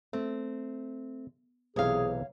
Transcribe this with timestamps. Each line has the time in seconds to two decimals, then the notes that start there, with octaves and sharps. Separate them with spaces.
0.13 A3 C4
1.76 B1 C3 E3 G#4 C#5 F5